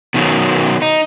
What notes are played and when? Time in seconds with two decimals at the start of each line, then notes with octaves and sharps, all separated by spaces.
0.14 B2 D#3 F#3
0.82 D#4